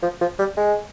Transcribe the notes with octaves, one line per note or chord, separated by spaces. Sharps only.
F3
F3
G3
G#3